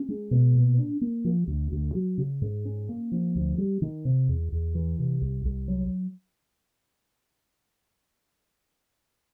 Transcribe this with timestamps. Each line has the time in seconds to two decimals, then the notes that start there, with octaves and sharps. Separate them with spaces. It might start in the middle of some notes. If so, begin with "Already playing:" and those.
Already playing: C#4
0.08 G#3
0.31 B2
0.55 A#2
0.78 D4
1.01 A#3
1.24 F3
1.47 D2
1.72 D2
1.95 F#3
2.18 C#3
2.42 G#2
2.65 C#4
2.89 A#3
3.12 F3
3.36 D2
3.58 G3
3.82 D#3
4.05 C3
4.28 E2
4.52 E2
4.75 E3
4.99 C3
5.21 C2
5.45 C2
5.68 F#3